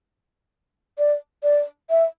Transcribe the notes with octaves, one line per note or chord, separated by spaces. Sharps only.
D5
D5
E5